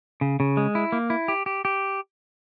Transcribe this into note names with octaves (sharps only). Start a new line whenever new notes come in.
C#3
C#3
G#3
E4
A#3
E4
G4
G4
G4